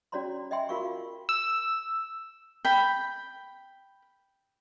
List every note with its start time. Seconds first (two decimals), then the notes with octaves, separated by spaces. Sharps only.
0.12 C#4 F#4 C#5 D5 A#5 C6
0.51 D#5 E5 G5 G#5 C6
0.69 F4 F#4 A#4 F5 C#6
1.29 E6
2.65 G5 B5